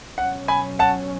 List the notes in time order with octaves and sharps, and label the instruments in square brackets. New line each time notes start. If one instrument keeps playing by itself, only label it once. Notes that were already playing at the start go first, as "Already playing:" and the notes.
[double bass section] B2 F#3 C#4 [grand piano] F#5
[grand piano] G#5 B5
F#5 A5